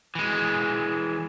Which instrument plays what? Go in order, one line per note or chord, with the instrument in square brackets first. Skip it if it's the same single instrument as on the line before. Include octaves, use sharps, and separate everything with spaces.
[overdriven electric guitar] E3 G#3